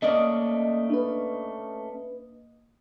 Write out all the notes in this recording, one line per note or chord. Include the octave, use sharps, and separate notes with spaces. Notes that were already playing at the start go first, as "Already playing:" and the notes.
A3 A#3 C#4 D5 D#5
D4 B4